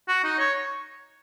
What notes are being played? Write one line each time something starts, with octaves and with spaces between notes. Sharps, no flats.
F#4
D#4
C#5